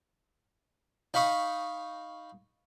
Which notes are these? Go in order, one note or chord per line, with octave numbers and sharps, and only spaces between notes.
D#4 F5 B5 C#6 D#6